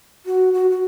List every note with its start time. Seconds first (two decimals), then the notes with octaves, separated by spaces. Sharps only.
0.26 F#4
0.53 F#4
0.71 F#4